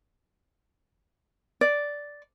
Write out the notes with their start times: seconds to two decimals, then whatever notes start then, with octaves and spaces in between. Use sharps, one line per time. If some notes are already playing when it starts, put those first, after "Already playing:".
1.61 D5